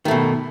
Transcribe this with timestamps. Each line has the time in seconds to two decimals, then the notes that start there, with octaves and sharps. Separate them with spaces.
0.05 D#3
0.08 A3
0.11 B2